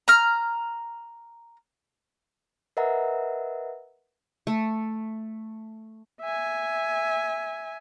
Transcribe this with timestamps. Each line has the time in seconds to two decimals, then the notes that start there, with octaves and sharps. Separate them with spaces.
0.08 A#5 F6
2.77 A#4 B4 D#5 E5 F#5 A#5
4.47 A3
6.21 E5 G#5